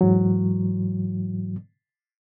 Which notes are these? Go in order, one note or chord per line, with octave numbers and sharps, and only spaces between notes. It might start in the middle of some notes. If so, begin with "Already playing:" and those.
G#2 E3 F#3